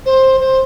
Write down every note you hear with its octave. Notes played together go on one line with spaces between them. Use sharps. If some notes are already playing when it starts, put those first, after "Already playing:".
C5
C5